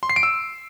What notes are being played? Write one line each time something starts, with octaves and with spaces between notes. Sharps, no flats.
C6
C7
D7
E6